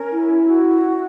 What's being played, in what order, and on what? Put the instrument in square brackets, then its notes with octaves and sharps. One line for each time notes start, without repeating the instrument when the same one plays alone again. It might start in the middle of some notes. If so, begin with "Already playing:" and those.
Already playing: [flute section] C#4 A#4
E4
F#4